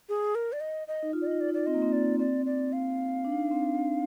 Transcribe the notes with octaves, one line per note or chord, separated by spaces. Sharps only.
G#4
A#4
D5
D#5
D#5
D#4
F4
D5
D#4 D#5
D5
D#4
D5
C4 D#5
A#3
C4
D5
C4 D5
D5
F5
D4
D#4
D4
C4
D4